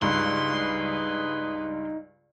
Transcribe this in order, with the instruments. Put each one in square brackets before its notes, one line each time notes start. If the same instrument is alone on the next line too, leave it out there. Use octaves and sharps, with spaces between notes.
[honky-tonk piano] C#2 G2 [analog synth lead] D#4 [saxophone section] G#4 B4 [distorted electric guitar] C6